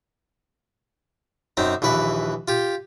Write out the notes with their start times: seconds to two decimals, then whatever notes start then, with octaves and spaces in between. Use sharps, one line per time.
1.57 F#2 C4 D#4
1.82 A#1 D#2 E3 B4
2.48 F4 G4